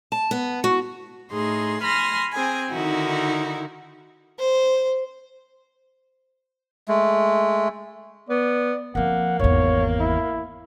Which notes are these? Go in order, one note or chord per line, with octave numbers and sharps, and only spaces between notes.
A5
B3
F#4
A2 D#4 G#4 C6
G#5 B5 C6 F6 A#6
C4 G#4 G#5
D3 D#3 D#4 E4 F#4
C5
G#3 A3
B3 D5
F3 A#3 C4 F#5
G#1 E2 C#5
E4